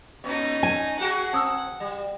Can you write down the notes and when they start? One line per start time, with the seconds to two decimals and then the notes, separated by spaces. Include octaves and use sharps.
0.24 A#2 C#4 D#4
0.63 G#5
0.99 A#3 F#4 G#4 F#5
1.33 C4 A5 D#6 E6
1.80 G3